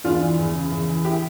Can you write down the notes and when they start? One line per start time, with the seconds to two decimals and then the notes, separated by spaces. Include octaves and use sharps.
0.04 E2 D4 F4
0.21 E3
0.38 E2
0.54 C#3
0.71 E2
0.89 E3
1.05 E4 G4